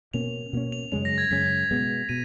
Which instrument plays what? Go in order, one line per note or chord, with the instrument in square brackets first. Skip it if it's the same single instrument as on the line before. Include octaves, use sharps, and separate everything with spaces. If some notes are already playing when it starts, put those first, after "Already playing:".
[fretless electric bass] B2 A#3 C#4 [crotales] F7
[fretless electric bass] B2 A#3 C#4
[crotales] F7
[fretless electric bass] F#2 C#3 G#3 C#4 [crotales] F7
[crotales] A#6
G#6
[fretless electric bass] F#2 C#3 G#3 C#4 [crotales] B6
[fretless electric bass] B2 G#3 B3
[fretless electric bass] B2 [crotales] D#7